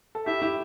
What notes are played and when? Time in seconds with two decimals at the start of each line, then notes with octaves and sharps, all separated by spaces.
0.15 A4
0.26 E4 G4 E5
0.42 E4 G4